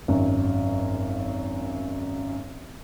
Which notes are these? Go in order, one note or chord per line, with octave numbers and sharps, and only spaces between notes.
G#1 F#2